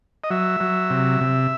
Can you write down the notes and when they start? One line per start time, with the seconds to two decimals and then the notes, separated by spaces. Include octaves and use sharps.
0.24 D#5
0.30 F#3 E5
0.60 F#3
0.90 C3
1.21 C3